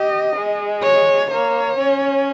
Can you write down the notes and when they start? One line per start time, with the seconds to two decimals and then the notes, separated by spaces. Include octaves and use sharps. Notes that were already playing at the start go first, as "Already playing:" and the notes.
Already playing: G4 D#5
0.35 G#3
0.82 C#5
1.30 A#3 C#5
1.77 C#4